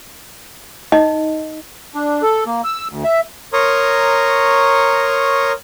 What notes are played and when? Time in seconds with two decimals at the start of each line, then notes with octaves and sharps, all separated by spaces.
0.92 D#4 D#5
1.95 D4
2.22 A4
2.46 A#3
2.64 E6
2.89 D2
3.04 E5
3.53 A#4 C#5 A#5 C6 C#6 D#6